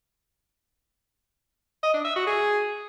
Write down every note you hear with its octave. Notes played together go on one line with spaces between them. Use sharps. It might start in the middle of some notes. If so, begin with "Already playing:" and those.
D#5
D4
E5
F#4
G#4